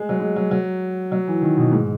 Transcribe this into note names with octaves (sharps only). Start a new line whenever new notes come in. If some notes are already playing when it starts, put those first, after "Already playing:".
Already playing: G#3
F#3
G#3
F#3
F#3
F#3
E3
D#3
B2
G#2